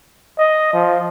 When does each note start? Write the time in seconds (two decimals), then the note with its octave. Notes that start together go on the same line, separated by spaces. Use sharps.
0.38 D#5
0.73 F3